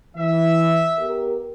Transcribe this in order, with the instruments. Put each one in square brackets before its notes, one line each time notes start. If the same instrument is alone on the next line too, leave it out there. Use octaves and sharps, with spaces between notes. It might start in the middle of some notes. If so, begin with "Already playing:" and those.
[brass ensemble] E3 [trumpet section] E5
[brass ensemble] B3 G4 A#4